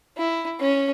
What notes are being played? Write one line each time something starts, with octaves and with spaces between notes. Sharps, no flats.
E4
C#4